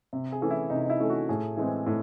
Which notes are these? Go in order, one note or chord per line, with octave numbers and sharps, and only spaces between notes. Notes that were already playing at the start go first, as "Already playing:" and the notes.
C3
G#4
E3 A3 C#4
E4
C3 D#4
D#4
E4
E3 A3 C#4
F#4
A2 G#4
E3 G#3 C4
A2